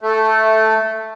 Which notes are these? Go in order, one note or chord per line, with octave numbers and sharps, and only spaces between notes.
A3